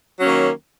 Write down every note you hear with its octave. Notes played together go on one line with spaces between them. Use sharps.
D#3 F#3 A#3 C#4